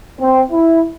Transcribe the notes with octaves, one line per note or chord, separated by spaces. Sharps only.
C4
E4